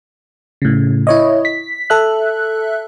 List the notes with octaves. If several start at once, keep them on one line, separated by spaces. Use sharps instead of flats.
A2 C#3
E4 C#5 D#5
B6
A4 E5 F#6